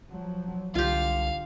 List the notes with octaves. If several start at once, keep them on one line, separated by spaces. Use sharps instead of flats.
F3 F#3
C2 D3 F4 G4 F5